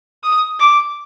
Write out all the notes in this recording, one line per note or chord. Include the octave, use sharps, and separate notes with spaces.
D#6
D6